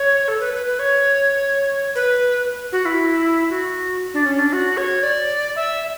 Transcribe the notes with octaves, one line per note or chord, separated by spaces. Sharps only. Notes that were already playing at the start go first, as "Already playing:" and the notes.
Already playing: C#5
A4
B4
B4
B4
C#5
B4
F#4
E4
F#4
D4
C#4
D4
F#4
C#5
D5
E5
E5